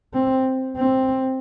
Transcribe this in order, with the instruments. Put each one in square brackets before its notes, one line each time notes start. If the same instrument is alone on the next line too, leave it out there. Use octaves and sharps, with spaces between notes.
[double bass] C4
C4